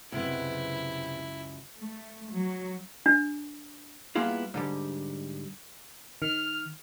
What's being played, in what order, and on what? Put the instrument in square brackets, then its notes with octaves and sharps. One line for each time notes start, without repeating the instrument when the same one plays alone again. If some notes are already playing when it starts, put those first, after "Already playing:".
[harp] C#2 F#2 [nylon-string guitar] C3 B3 [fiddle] E4
[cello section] A3
F#3
[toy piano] D4
[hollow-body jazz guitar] G3 A#3 B3 E4 F4 G#4
G#2 D3 G3
[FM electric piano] D#3 [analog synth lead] F6